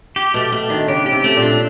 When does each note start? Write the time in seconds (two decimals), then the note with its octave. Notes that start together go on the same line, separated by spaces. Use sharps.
0.16 G4
0.34 B2 A3
0.52 B2 A3
0.70 D#3 D4
0.88 C#3 G4
1.06 G4
1.12 C3
1.24 A3
1.37 A#2
1.42 D4